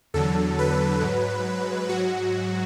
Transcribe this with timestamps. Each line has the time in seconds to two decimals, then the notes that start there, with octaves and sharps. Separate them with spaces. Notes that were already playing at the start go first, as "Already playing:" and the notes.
0.14 E2 D3 F#3 A4
0.59 B4
1.02 G#2 F#3
1.89 G#2 F#3 F#4